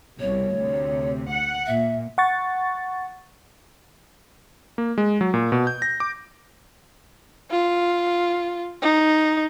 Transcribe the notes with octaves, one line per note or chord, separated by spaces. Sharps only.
C2 B2 C#5
D2 C3
F#5
A#2 E5
F#5 C#6 A6
A#3
G#3
F#3
A#2
B2
G6
A#6
D6
F4
D#4